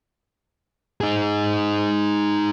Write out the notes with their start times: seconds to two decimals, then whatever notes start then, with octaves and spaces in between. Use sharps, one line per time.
1.01 D#4 G#4